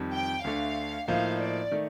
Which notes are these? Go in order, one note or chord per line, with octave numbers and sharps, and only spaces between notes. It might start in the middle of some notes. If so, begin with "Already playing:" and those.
Already playing: F2 D#3 G3
G5
D2 D3 A3 D4 F5
A2 F3 A#3 D#4 F5
D5
D#3 A3